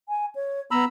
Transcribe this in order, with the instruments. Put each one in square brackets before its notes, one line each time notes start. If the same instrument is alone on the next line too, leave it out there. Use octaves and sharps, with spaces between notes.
[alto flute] G#5
C#5
[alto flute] B3 [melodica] A#5 B5 E6